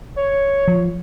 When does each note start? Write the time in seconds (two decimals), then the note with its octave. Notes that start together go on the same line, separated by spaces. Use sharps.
0.17 C#5
0.68 F3